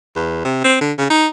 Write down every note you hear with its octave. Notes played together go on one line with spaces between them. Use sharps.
E2
C3
C4
D3
C#3
D#4